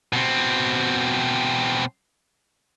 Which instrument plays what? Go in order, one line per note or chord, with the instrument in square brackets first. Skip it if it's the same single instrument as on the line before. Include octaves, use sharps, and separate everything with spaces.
[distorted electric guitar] B2 C4